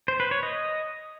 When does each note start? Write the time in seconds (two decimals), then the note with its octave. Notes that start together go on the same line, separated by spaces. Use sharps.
0.08 C5
0.20 B4
0.31 C#5
0.43 D#5